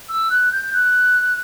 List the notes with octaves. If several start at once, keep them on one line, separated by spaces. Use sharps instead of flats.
E6
F#6
G6
F#6